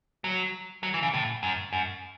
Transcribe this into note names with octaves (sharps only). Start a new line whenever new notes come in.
F#3
F#3
E3
C#3
A2
F#2
F#2